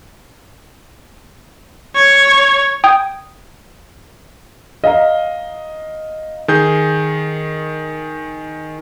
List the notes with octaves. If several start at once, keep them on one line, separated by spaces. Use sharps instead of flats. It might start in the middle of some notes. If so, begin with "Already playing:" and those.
C#5
G5 D#6 G#6
D#5 F5 A#5
D#3 G#4 G6